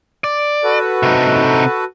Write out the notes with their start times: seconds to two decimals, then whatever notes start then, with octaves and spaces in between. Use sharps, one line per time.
0.24 D5
0.64 F#4 A4 B4
1.03 C3 D#4